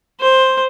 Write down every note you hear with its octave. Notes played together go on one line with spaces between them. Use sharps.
C5